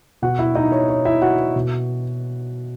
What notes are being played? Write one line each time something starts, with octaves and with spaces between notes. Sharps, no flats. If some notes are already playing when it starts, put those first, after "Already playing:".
B2 F#4 F#5
E4 E5
D#4 D#5
C#5
C#5
E4 E5
F#4 F#5
B2